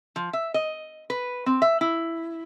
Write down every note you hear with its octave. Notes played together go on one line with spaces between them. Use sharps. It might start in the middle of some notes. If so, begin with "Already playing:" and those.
F3
E5
D#5
B4
C4
E5
E4